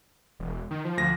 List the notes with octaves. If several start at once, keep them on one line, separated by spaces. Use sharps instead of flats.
E1
D#3
F3
D2 A#6